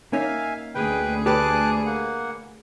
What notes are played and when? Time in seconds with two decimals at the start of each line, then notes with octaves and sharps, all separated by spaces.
0.13 A#3 C#4 D#4 E5 F5 G#5
0.75 D2 G#4 B4 G5
1.26 G4 A4 B4 A5 D6 F#6
1.86 A#3 F#5